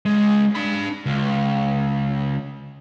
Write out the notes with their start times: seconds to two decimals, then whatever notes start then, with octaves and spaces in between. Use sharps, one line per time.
0.05 C#2 G#3
0.55 D4 B5
1.06 C#2